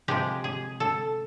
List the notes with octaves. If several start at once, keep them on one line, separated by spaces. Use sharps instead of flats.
C3 F3 G#3 G4
G#4
A4